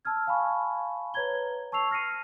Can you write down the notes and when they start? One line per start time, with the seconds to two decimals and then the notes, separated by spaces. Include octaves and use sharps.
0.05 A5 E6 F6 G#6
0.27 F5 G#5 A5 B5 C#6
1.14 B4 C#5 A#5 G#6 G7
1.72 A5 C#6 E6 C7 F7
1.91 F6 A#6 C7 C#7 D#7